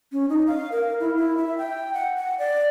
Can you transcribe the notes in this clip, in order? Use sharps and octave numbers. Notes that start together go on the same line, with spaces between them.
C#4
D#4
F5
A#4
E4
E4
E5
G5
F#5
F#5
D5